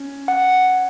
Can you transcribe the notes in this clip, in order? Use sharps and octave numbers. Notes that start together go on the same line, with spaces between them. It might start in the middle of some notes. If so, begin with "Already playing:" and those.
Already playing: C#4
F#5